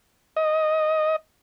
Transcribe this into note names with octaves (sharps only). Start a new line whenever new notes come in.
D#5